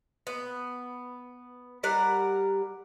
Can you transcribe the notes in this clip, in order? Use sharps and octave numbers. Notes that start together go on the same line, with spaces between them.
B3
G3 A#4 F#5